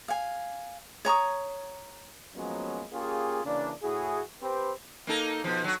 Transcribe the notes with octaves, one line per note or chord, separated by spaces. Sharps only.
F5 G#5
C#5 A#5 C#6 D#6
F3 F#3 G#3 A#3 B3 C#4
A#3 C#4 F4 G4 G#4
C#3 E3 A#3 D4
A2 E4 F#4 G#4
C4 G4 B4
A#3 D#4 A4
B2 F3
F#3 F#4